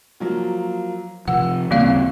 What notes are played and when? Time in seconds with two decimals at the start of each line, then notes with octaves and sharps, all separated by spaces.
0.20 F3 F#3 A#3
1.28 C3 F3 F#5 E6
1.71 D#1 A1 C#3 G3 A#3 C4 F5